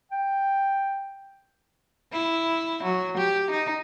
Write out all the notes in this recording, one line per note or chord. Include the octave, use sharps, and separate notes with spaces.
G5
E4
F#3
G4
D#4